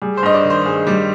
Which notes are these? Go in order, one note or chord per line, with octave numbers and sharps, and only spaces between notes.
G3 G#4
C5
G2 D#5
D5
D#3
C5
G2 G#4
G3